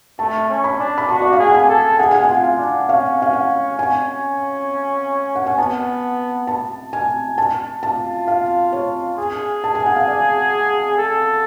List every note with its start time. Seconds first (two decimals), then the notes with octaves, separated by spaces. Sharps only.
0.19 A3 A5
0.49 C#4
0.64 B5
0.79 D4
0.98 B5
1.08 F#4 A5
1.22 D5
1.33 F5
1.39 G#4 F#5
1.54 G#5
1.69 A4
1.98 G#4 F#5
2.11 G#5
2.23 F#5
2.28 F4
2.44 F5
2.58 D4
2.88 C#4 F5
3.22 F5
3.33 F#5
3.78 C#4 G#5
5.35 F#5
5.47 G#5
5.58 B3 A5
6.47 A5
6.93 G#5
7.38 A5
7.83 F4 A5
8.28 F5
8.73 C#5
9.17 G#4
9.64 A5
9.75 G#5
9.86 F#5
9.96 F5
10.08 D5
10.97 A4